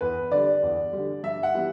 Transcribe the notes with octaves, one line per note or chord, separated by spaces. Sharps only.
E2 B4
D3 G3 D5
E2
D3 G3
G2 E5
F#5
E3 G3 B3